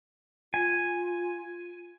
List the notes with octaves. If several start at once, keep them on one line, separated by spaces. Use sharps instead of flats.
F4 G#5